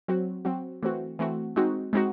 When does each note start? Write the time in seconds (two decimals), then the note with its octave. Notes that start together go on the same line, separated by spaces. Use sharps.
0.08 F#3 C4 F#4
0.45 F#3 C4 F#4
0.83 E3 A3 C4 F#4
1.19 E3 A3 C4 F#4
1.56 G#3 C4 D#4 F#4
1.93 G#3 C4 D#4 F#4